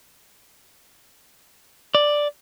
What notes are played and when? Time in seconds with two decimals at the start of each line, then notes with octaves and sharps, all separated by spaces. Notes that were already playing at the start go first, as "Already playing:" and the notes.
1.95 D5